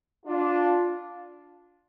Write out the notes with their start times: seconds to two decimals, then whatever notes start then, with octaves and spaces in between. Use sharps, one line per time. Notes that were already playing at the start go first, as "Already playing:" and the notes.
0.25 D4 F4